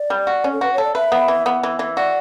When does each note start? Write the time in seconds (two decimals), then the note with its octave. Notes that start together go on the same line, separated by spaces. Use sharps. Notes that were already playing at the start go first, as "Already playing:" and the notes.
Already playing: D5
0.10 G3
0.27 F#4
0.44 C#4
0.52 A4
0.61 F#4 B4
0.73 A4 C#5
0.84 D5
0.95 B4 E5
1.12 B3
1.28 E3
1.46 B3
1.63 E3
1.79 E3
1.97 F#4 D5